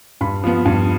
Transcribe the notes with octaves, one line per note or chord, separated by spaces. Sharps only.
G2 B5
F3 B3
G2